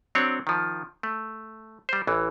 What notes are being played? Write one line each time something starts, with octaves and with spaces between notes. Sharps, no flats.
F#3 C4 D4 C#5
D#3 F3
A3
G3 C5
A1 E3